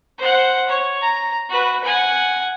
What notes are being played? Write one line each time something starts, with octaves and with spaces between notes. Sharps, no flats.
C5 F#5
C#5
A#5
F#4 B4
F#5 G#5